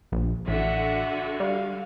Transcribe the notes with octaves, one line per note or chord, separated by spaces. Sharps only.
A#1
A1 D3 F#4 E5 F#5
G3 F5